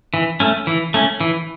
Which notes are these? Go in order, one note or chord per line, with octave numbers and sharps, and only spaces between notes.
E3
A3 C#4
E3
A3 C#4
E3